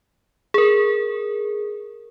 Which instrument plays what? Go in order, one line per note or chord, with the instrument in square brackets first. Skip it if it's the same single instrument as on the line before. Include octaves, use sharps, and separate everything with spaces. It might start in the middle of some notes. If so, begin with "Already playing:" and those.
[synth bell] G#4 A#4